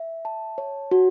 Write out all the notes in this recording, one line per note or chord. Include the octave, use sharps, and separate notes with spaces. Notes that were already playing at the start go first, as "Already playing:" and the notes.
Already playing: E5
A5
C#5
F#4